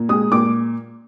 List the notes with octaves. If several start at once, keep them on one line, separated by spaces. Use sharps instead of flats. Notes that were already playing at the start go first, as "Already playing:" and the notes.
Already playing: A#2
G#3 D#6
A#2 D6